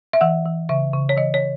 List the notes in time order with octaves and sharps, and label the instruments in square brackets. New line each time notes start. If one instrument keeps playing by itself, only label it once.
[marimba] E5
E3 F#5
E3
C#3 E5
C#3
C#5
E3 D#5
C#5